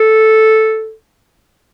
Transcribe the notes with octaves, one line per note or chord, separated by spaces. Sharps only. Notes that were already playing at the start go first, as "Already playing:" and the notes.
Already playing: A4